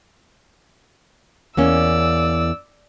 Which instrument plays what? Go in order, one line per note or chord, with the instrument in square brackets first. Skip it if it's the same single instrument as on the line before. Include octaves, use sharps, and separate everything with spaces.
[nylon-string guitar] E2 A#3 C#4 [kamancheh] D5 E6